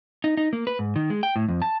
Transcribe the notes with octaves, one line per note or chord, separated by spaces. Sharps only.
D#4
D#4
A#3
B4
G#2
D#3
G#3
G5
A2
F2
A5